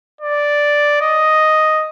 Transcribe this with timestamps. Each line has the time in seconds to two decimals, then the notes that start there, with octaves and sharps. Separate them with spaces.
0.21 D5
1.01 D#5